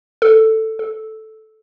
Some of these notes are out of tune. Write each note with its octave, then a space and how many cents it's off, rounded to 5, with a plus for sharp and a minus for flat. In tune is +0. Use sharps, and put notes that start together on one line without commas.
A4 +10
A4 -5